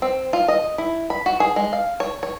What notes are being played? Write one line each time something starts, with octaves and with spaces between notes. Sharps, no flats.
C4
F4
D#5
E4
B5
F#4
G#4
G#3
F5
C#5
C#5